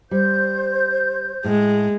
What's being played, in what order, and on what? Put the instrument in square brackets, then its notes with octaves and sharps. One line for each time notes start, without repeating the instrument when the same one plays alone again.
[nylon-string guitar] G3 [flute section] C5 G6
[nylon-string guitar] A2 [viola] G#3